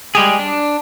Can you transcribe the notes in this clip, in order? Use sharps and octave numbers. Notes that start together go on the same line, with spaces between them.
G3 G#3 G4 G#4
D4